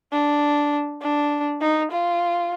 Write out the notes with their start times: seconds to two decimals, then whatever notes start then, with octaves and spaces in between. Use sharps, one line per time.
0.12 D4
1.02 D4
1.61 D#4
1.91 F4